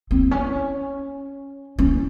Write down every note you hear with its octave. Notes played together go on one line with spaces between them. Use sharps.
C4
C#4
C#4